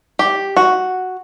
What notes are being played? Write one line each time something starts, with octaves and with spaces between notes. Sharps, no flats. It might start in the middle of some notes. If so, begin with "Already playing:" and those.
G4
F#4